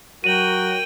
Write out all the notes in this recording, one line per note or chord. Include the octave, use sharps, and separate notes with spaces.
F#3 F#4 A#4 G5 D#7 F#7